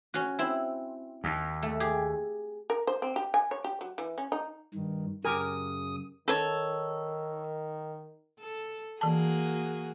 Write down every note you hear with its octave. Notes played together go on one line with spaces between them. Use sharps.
C#4 F#4
C4 E4
D#2
A3
G4 G#4
A#4
C5
C4
G4
G#5
C#5
G4
F#3
E3
C#4
D#4
G2 D#3
F#2 C#3 G4 A#4 G#5 D#6
D#3 A4 C#5
A4
E3 A#3 F#4 G#4 A5